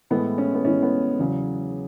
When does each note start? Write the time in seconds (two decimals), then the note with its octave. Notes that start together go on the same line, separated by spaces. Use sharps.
0.10 A2 E3 G#3 B3
0.38 C#4
0.54 B3
0.64 A2 E3 G#3 C#4
0.83 B3
1.19 E2 C#3 F#3